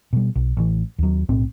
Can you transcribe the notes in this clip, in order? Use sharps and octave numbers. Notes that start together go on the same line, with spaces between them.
B2 G3
B1
A1 E3
D#2 F#3
B1 A2 C4